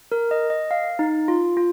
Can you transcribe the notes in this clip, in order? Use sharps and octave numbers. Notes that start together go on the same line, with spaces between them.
A#4
D#5
D#5
F5
D#4
F4
F4